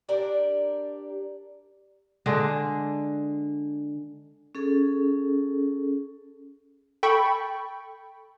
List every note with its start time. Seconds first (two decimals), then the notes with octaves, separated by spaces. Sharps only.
0.09 D4 G4 A#4 D5
2.26 D3 G#3 D4
4.55 C#4 G#4 A4
7.03 A4 G5 B5 C#6